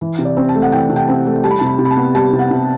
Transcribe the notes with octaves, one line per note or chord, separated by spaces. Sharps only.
E3
C3
D5
C4
A5
A3
F#5
E3 G5
C3
G5
C4
A3
G3 A5
B5
C3 A5
B5
C3
B5
A5
B3
G3 A5
C3
F#5
C3